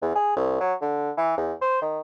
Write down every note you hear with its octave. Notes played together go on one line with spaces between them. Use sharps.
E2
G#4
C2
F#3
D3
E3
E2
C5
D#3